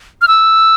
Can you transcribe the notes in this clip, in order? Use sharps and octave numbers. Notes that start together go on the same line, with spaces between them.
F6
E6